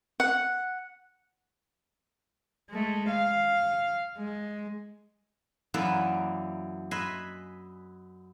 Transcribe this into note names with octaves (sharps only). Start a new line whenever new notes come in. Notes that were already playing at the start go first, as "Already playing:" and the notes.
F#5
G#3 A3
F5
G#3
F#2 E3 A#3 B3 E4 D5
B4 D#5 E5 G#5 B5 C6